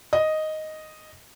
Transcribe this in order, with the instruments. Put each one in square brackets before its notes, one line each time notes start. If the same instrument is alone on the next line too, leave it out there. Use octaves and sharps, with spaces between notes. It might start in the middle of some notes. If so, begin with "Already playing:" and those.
[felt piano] D#5